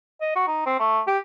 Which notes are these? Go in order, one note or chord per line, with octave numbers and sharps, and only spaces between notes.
D#5
F#4
D#4
C4
A3
G4